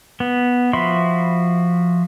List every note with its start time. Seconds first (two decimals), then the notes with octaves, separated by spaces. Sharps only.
0.20 B3
0.73 F3 F#4 E5 B5 C6